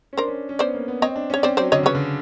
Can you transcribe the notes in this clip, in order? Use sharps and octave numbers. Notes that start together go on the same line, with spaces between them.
C#4
D4 A#4 C5
C#4
C#4
B3 C5 D5
A#3
B3
C4 C#5 D#5
D4
C#4 C#5
C4 C5 D5
F#3 C5 D5
D3 C#5 D#5
C#3 B4 C#5
D3